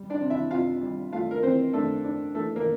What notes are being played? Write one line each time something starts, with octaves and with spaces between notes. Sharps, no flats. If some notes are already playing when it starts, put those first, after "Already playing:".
Already playing: G3
D4 D5
C3
E4 E5
C3 F4 F5
G3
A3 F4 F5
A#4
E3 C4 C5
A3 D4 A4
D4
E3 A3 A4
A#3 A#4